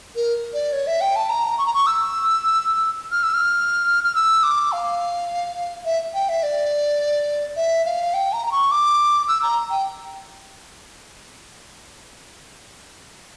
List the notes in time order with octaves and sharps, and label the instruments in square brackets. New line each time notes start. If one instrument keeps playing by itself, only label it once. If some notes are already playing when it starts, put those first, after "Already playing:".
[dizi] A#4
D5
C#5
E5
G5
A5
A#5
C#6
A#5
C#6
E6
F6
E6
F6
F6
E6
D6
F5
E5
G5
E5
D5
E5
F5
G5
A#5
A#5
C#6
D6
E6
A#5
G5